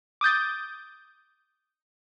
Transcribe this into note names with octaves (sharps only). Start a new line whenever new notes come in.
D6 D#6 G6 A6